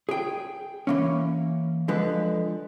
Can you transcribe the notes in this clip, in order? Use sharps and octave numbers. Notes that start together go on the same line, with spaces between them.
G#4 G5
E3 A#3 C#4
D3 F3 G#3 B4